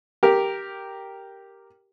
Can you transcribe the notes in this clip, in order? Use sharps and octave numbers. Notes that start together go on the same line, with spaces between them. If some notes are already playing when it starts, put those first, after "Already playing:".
G4 A#4